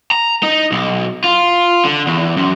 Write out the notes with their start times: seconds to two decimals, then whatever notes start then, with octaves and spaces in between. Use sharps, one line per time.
0.11 A#5
0.43 D#4
0.72 B1
1.24 F4
1.85 D3
2.07 E2
2.37 F#2